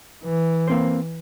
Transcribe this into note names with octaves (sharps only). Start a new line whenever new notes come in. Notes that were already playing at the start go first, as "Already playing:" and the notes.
E3
A#3 C4 C5